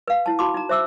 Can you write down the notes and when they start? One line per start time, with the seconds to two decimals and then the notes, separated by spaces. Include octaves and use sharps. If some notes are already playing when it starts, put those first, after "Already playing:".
0.08 B4 F5
0.26 E4 A5
0.39 F#4 A5 B5 C6 D6
0.54 D#4 A#5
0.69 C5 E5 D6 E6